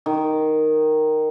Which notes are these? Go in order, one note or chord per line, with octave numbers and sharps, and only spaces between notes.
D#3